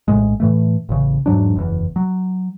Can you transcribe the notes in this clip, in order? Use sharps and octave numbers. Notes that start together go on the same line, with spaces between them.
A#1 D#2 A2 G#3
A2 E3 A3
A1 C#3
E2 G#2 F#3 D4
F#1 E2
F#3